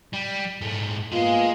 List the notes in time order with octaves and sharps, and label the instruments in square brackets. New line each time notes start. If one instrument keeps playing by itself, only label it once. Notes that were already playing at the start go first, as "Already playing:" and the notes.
[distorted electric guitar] G3
G#2 A3
[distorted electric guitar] G#3 G#4 [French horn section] A#3 B3 F4